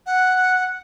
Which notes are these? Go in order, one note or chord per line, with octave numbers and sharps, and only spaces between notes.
F#5